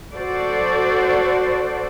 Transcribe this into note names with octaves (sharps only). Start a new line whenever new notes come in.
F#4 A4 C5 D5